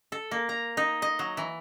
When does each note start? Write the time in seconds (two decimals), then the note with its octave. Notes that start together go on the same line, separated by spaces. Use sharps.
0.12 A4
0.31 A#3
0.49 A#5
0.77 D#4
1.02 D#5
1.19 F#3
1.37 E3